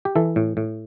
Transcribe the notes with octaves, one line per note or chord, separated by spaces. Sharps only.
G4
E3 A4
A2
A2